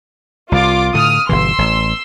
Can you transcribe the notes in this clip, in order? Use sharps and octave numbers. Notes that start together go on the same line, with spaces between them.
C2 F4 D6
A2 D3 D#6 F6
G1 B2 E3 C6 E6
A1